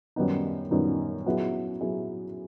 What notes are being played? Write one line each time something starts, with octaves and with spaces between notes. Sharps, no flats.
F#2 D#3 G3 B3 D#4
F#2 D#3 G3 B3 D#4
F#3 B3 E4 G#4
F#3 B3 E4 G#4